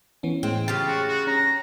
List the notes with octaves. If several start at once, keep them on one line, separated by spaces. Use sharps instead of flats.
E3 B3 C#4
A2 G#3 C4
C#3 F4 G4 A6
F#4
F#4
C#4 A#5